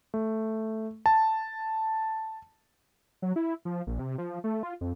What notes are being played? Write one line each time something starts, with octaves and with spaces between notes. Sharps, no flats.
A3
A5
F#3
E4
F3
A#1
C3
F3
A3
F4
F2